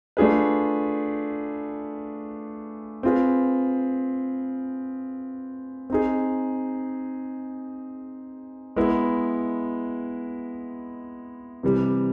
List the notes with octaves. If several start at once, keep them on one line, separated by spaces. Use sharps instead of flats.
A3 D4 F4 G#4 B4
C4 F4 G#4 B4
C4 D#4 G#4
G#3 B3 E4
C3 E3 G3